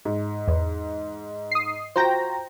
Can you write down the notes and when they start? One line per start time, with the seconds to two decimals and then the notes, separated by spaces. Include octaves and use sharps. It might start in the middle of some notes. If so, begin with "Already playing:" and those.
0.05 G#2
0.48 E2
1.52 D#6 C7
1.96 F4 F#4 C5 G5 A#5 A#6